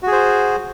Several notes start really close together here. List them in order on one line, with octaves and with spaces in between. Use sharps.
F#4 G#4 C5